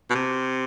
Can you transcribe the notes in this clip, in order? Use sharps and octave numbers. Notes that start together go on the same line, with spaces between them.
B2
C3